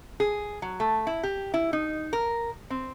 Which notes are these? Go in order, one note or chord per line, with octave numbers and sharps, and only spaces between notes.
G#4
F#3
A3
E4
G4
E4
D#4
A#4
C4